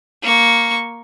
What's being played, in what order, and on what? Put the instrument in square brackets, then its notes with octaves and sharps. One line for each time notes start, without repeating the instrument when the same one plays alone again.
[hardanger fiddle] A#3 C#6